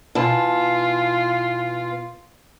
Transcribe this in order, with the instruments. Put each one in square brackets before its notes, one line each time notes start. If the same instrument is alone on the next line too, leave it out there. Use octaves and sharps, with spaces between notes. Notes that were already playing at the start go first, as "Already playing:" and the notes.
[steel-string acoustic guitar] B2 E3 A5 [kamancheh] F4